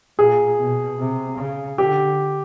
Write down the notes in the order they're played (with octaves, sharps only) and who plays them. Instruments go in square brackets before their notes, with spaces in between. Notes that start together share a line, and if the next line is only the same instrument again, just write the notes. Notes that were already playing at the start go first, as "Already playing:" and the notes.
[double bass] A#2 [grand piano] G#4
[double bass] B2
C3
C#3
[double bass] D3 [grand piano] G4